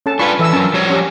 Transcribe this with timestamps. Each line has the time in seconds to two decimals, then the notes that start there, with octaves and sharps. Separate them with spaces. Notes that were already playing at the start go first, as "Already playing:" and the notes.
0.06 C#4 A4 A5
0.19 D4 F4 B4 B5 C#6
0.39 E3 A4 E5 E6
0.53 F#3 C#4 A#4 A5
0.74 F3 G3 C#5
0.90 C#4 G4